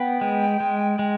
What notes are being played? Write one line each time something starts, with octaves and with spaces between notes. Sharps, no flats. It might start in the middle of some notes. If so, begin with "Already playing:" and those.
Already playing: B3 G5
G#3
G#3
G#3